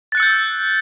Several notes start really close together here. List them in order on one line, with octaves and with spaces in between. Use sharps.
A6 F#6 C#7 E6 G6